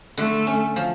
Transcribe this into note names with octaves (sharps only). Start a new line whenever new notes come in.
D3 A3
C#4
F3